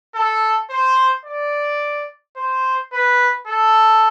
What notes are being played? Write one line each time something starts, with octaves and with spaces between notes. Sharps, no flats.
A4
C5
D5
C5
B4
A4